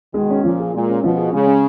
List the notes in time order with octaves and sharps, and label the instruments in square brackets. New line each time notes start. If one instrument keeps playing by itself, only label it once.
[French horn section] B2 D#3 [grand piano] G#3
[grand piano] C#4
[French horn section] A#2 [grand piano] F3
[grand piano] G#4
[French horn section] A#2 [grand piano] G#3
[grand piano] C#4
[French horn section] B2 [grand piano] F3
[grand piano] G#4
[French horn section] C#3 [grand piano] G#3
[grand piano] C#4